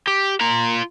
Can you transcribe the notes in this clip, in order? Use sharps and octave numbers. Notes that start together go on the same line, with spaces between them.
G4
F4 A#5